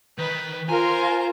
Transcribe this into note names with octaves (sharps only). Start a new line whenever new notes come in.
D#3 B4
F4 A#4 C5 G#5 A#5 C6